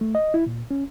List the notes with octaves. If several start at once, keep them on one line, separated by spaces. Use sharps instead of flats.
A3
D#5
E4
A#2
C#4